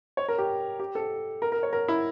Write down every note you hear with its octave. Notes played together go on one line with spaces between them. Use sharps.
C#5
A#4
G4
G4
A4
A#4
A#4
C#5
A#4
E4